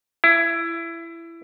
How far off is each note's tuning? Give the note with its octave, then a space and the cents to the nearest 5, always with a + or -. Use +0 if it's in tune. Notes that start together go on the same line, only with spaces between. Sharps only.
E4 +20